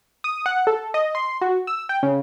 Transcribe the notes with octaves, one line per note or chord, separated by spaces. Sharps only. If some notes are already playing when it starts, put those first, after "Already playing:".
D#6
F#5
A4
D#5
C6
F#4
E6
G5
C#3